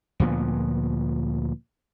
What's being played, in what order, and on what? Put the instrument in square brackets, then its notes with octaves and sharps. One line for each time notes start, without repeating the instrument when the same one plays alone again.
[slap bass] D2 A#2 F3 B3